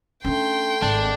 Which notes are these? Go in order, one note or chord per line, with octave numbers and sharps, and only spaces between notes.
A3 C#4 D4 G5 C6
G#1 D4